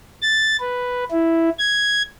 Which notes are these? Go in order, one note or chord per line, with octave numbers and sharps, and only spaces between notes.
A6
B4
E4
G#6